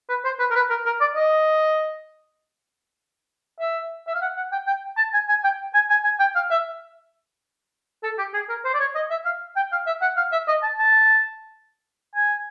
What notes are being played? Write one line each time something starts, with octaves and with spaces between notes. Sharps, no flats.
B4
C5
B4
A#4
B4
A#4
A#4
D5
D#5
E5
E5
F5
F#5
F#5
G5
G5
A5
G#5
G#5
G5
G#5
G#5
G#5
G5
F5
E5
A4
G4
G#4
A#4
C5
D5
C#5
D#5
E5
F5
G5
F5
E5
F#5
F5
E5
D#5
A5
A5
G#5